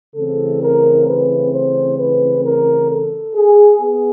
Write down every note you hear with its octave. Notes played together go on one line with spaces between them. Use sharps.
C#3 E3 A3 C4 A4
A#4
B4
C5
B4
A#4
A4
G#4
B3 G#4